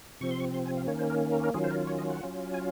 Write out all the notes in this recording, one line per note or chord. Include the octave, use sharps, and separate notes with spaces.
C3 F3 C4 C#6
C6
C#6
C6
G#5
F5
D#3 A#3 C#4 C#5
C5
A#4
A#4
A#4
D#3 F#3 C#4 F4 G#4
C5
A#4
C#5
D#5
F#5
F#3 C#4 F4
G#5